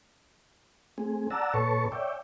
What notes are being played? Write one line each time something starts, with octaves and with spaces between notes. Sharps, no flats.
A3 C4 G#4
D5 F#5 A5 A#5 E6
A#2 A4 B4 C#5 A5 C#6
C#5 D5 E5 G5